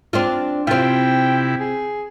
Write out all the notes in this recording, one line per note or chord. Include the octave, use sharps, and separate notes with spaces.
C4 D4 F4
C3 C4 E4 F4 G5
G#4